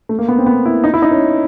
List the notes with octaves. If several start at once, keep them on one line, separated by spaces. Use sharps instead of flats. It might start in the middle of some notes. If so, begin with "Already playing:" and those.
A3
A#3
B3
C4
B3
E4
D#4
E4
D#4
C#4